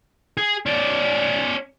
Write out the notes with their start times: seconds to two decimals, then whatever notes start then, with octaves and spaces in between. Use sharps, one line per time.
0.37 G#4
0.66 C#4 D5